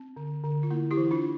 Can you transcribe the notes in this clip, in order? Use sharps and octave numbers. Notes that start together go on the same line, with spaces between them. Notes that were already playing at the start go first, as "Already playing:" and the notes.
Already playing: C4
D3
D3
F4
A#3 E4
E4 G4
E3
D4 F4